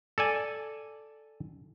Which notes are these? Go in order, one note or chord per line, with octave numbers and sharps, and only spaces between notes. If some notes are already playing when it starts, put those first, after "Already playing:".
A4 D5 G#5